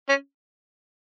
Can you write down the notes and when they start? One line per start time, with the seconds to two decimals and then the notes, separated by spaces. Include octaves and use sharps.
0.09 C#4